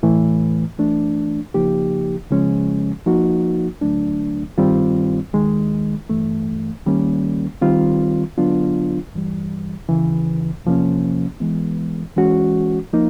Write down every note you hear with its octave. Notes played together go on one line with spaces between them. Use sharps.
A2 E3 A3
E3 A3 D4
C#3 F3 A#3 D#4 G4
C#2 C#3 F3 G#3 C#4
F3 A#3 D#4 F#4
D2 D3 F#3 A3 D4
G2 D#3 G3 C4 F4
D#2 D#3 G#3
G2 E3 A3
D#2 D#3 G3 A#3 C#4
D#3 G3 C4 F4
D3 F#3 B3 D4 F4
G2 E3 G3
D#2 C#3 E3
E2 C3 F3 A#3 C#4
E3 G#3 B3
E3 G#3 C#4 F#4
F3 A#3 D#4